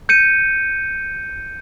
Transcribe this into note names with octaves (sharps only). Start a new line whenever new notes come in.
G6 C#7 D#7